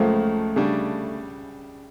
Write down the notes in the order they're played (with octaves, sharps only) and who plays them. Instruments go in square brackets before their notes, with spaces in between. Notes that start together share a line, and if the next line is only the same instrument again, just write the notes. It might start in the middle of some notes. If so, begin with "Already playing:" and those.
Already playing: [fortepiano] C#2 C#3 F3 A#3 [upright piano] A3
[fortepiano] C#3 G3 D4